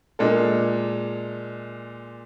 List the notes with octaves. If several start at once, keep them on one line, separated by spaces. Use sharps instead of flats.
A#2 G#3 D4 A4